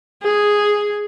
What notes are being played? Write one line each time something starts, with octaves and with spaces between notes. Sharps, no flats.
G#4